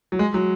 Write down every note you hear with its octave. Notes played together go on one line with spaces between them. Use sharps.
F#3
G#3
F#3